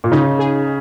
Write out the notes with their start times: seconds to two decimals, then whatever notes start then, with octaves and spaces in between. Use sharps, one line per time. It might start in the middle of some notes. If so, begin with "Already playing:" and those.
0.04 A#2
0.12 C#3 D#4
0.39 G#4